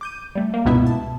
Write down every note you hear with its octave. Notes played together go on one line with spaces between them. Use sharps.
D6 G6 D#7
G3 A3
A#3
C#2 G2 B2 B3 E4 E5
A5